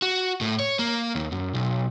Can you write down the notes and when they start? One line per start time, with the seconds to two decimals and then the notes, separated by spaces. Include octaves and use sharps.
0.02 F#4
0.41 A2
0.59 C#5
0.79 A#3
1.15 D#2
1.32 F#2
1.54 B1